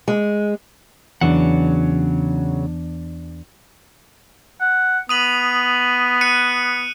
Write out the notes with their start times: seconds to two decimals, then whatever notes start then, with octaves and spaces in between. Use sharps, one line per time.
0.08 G#3
1.21 E2 C#3 F#3 D4 F#5
4.61 F#5
5.09 B3 D#6 D#7 F#7
6.21 F#6 C#7 D#7